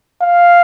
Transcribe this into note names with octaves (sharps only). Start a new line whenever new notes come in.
F5